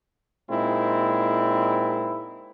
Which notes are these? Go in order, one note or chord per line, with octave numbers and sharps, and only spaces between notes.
A#2 G#3 C4 D#4 E4